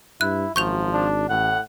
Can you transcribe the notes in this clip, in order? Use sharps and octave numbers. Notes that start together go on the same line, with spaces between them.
G2 E4 F#6
G#1 F#2 F3 C#6 G6 F7
D4
A1 A2 F#5